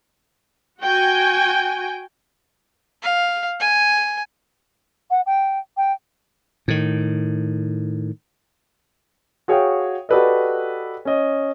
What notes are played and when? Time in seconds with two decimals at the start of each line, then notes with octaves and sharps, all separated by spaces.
0.80 F#4 G5 G#5
3.02 F5
3.60 G#5
5.11 F#5
5.26 G5
5.77 G5
6.68 A2 D#3
9.48 F#4 G#4 C#5 F5 G5
10.09 F#4 G4 A4 B4 D5 D#5
11.05 C#4 D#5